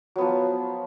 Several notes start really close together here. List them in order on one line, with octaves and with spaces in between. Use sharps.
F#3 B3 F3